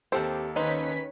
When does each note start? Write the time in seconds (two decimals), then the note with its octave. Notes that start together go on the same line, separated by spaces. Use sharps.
0.12 D#2 C4 G4 A4 C5
0.56 D#3 C#4 D#4 B4 C5 B6